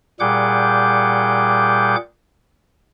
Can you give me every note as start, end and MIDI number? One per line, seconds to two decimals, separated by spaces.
0.20 1.96 46
0.20 1.96 55
0.20 1.96 68
0.20 1.96 78
0.20 1.96 86
0.20 1.96 91